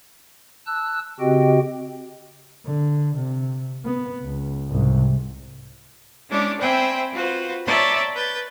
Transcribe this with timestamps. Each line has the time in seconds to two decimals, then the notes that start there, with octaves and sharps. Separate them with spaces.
0.66 A5 E6 F#6
1.20 C#3 C4 F#4 G4 D#5 G5
2.66 D3
3.15 C3
3.85 B3
4.23 C#2
4.68 C2 G#2
6.29 G#3 C#4 D4 E4 C#5 D6
6.60 C4 C5 E5 G5 G#5 B5
7.13 F4 F#4 B4 C5
7.66 C#5 D5 E5 A5 A#5 C6
8.15 B4 G6 A6